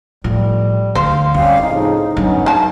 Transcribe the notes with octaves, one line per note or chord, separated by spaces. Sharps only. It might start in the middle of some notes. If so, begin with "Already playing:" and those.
A2 F3 G3
D2 C5 F5
G3 C4 C#4 G4 F5
A2 C#3 F3 D#4
G#2 F#3 B3 C#4 D4
A#3 A5